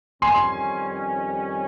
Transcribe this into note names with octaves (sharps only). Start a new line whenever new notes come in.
F2 D#3 G3 C#4 G#5 C6